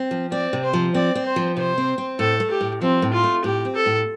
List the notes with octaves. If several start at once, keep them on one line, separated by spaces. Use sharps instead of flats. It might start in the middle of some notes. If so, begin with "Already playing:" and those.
Already playing: C4
F3
C4 D5
C3
C5
F3
C4 D5
C4
C5
F3
C3 C5
C4
C4
A2 A4
A3
G4
A2
F3 C4
A2
F4
A3
A2 G4
C4
A4
A2